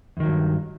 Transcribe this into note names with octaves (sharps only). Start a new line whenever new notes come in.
E2 G2 D#3 F#3